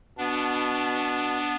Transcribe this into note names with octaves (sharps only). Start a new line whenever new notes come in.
B2 B3 D4